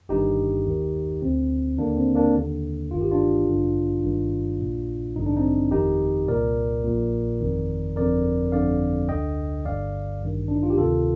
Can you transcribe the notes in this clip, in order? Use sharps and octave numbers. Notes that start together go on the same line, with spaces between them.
G1 G2 D#3 D#4 G4
D#2 D#3
D2 D3 C4
D#2 D3 A#3 D4
C4
A#3 D4
D#2 D3
G1 G2 D#3 F4
G4
D4 F4
A1 G2 D3
G1 G2 D#3
A#1 A#2
A1 G2 D3 D#4
D4
C4 D#4
G1 F2 D#3 D#4 G4
C2 A#2 A#4 D5
A#1 A#2
G1 F2 D#3
G1 F2 D3 A#4 D5
G1 F2 D3 D5 F5
D2 D3 D#5 G5
G1 G2 D3 D5 F5
A1 G2 D#3
D4
D#4
F4
G4
D2 C3 D#3 F4 A4